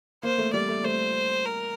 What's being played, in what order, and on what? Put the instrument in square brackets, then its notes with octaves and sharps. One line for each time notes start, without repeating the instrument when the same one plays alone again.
[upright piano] A#3 [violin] C5
[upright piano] A3
[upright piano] G3 [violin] D5
[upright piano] A3
[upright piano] A3 [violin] C5
[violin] A#4